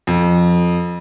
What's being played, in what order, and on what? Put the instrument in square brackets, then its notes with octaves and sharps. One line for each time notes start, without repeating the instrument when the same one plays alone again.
[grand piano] F2